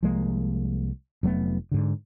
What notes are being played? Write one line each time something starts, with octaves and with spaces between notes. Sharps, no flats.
C2 F3 G#3 A#3
F1 F#3 A3 B3
G#2 D3